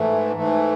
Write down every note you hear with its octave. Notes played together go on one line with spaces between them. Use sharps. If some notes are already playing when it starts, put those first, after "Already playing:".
Already playing: G#2 E3 A3
G#2 E3 A3